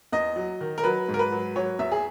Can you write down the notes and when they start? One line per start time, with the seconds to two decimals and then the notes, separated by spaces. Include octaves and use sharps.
0.12 E2 D#5
0.36 F#3
0.61 D#3
0.78 A#4
0.84 F#3 B4
1.08 G#2
1.14 A#4
1.19 B4
1.32 F#3
1.56 F#3 C#5
1.79 E2 E5
1.92 G#4